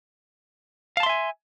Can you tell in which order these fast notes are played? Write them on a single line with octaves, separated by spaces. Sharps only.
F5 A5 C6 E5 G#5